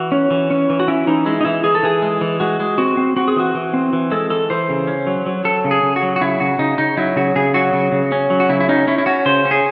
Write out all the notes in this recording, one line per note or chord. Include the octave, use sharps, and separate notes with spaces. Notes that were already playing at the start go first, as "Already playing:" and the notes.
Already playing: E3 F#4
C#4
E3
C#4
E3
F#4
C#4 E4
E3 D#4
G#3 E4
D#4
E3 E4
E3 G#4
A4
E3 G#4
G#3
E3
G#3 F#4
G#3
C4 F#4
C4
C4 F#4
G#4
E3 F#4
E3
C4
E3
G#3 A4
E3 A4
E3 C5
C#3
C#4
F#3
F#3
F#3 A4
C#3
G#4
C#3
F#4
F#3
F#4
C#3 E4
C#3 F#4
C#3 D#4
C#3 D#4
F#3 E4
C#3 F#4
C#3 G#4
F#3 F#4
C#3
C#3
C#4
F#3
F#4
C#3 E4
E4
C#4 D#4
C#4 E4
E4
C#4 F#4
C#3 C5
C#4
G#4